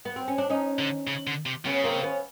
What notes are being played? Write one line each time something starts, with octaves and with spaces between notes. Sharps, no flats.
B3
C4
C#4
D4
C#4 D#4
D3
C#3
D3
C3
C#3 B3 C#4
A#3 C4
B3 C#4